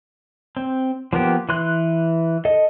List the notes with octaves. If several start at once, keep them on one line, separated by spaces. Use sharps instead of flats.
C4
F3 A#3 B3 G4
E3 B4 C6 F#6
A4 D#5